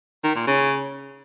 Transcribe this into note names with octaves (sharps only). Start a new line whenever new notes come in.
D#3
A#2
C#3